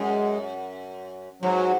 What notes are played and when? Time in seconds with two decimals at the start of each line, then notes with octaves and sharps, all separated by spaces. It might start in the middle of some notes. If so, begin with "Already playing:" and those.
Already playing: F#2 G#3
1.42 G#2 F#3